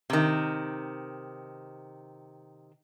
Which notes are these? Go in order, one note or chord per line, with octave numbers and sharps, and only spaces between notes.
C3 D#3